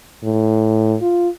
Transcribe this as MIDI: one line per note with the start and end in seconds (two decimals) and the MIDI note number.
0.23 0.96 45
1.01 1.29 65